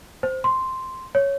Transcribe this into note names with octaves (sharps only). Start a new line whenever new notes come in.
C5
C6
C#5